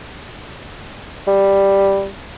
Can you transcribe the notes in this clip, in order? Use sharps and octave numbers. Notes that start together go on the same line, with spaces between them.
G3